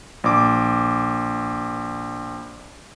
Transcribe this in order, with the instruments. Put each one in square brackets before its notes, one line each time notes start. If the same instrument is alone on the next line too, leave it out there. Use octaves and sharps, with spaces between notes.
[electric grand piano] A#1 D6